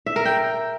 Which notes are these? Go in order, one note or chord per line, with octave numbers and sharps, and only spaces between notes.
E5
A#4
G5